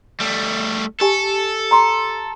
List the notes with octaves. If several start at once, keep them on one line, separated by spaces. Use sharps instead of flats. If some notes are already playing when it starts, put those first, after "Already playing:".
G3 A3
G4 A4 G#5 A5
A#5 C6